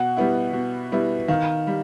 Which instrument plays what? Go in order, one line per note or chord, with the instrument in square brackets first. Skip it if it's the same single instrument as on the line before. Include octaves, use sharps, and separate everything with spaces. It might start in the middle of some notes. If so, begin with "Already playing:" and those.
Already playing: [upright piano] B2 [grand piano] F#5
[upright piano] G3 B3 E4
B2
G3 B3 E4
[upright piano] D#3 [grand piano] F5
[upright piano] G3